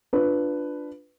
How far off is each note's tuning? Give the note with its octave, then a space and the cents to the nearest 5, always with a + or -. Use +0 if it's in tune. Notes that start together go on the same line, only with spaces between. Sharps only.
D4 +0 F4 +0 B4 +5